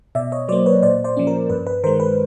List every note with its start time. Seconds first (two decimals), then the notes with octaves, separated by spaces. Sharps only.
0.15 B2 D5 E5
0.32 C#5 D#5
0.49 F#3 C5 D5
0.52 A#3
0.66 B4 C#5
0.82 A#2 C5 D5
1.04 C5 D5
1.17 F3 A#3 C#4
1.27 A#4
1.50 G2 B4
1.67 B4
1.84 D#3 A#4 C5
1.87 G#3
2.00 B4